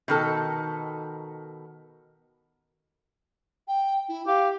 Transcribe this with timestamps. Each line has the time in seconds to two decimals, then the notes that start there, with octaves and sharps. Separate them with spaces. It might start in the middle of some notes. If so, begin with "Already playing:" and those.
0.08 B2 D#3 A4
3.68 G5
4.08 E4
4.27 G4 F5